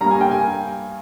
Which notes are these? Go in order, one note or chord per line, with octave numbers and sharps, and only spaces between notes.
G2 G3 A#3 A#5
G#5
G5
G#5